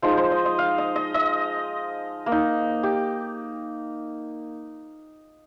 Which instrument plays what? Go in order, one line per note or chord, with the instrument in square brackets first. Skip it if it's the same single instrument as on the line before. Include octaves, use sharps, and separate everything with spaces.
[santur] F3 G#3 D#4 C5
C5
D#5
D#5
F5
D#5
D#5
D#5
A#3
D#4
G4